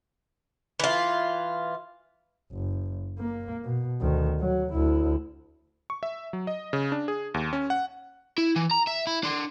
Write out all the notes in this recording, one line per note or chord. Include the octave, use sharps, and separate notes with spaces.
E3 F4
F#1
A#3
B2
D2 D#3
F#3
D2 E4
C#6
E5
F#3
D#5
C#3
D4
G#4
D#2
C#4
F#5
E4
E3
A#5
E5
E4
D4 C6